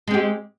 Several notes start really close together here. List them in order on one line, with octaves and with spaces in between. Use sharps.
G#3 C4 G4